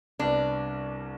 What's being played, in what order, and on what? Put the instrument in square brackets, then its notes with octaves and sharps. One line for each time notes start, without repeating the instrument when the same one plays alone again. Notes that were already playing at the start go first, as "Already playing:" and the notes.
[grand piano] C2 C3 G3 B3 [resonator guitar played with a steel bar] D4